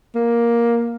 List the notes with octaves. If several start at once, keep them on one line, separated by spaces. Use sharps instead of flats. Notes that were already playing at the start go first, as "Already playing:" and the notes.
A#3